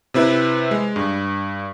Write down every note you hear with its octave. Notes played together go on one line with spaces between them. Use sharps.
C3 C4 E4 B4
G#3
G2